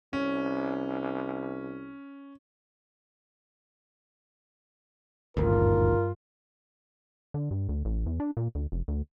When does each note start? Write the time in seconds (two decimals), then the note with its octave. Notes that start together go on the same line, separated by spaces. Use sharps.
0.13 C2 C#4
5.37 D#1 G#1 D2 G2 F4 A#4
7.34 D3
7.51 G2
7.69 D2
7.85 A1
8.06 E2
8.20 D4
8.37 A#2
8.55 D2
8.72 F1
8.88 D2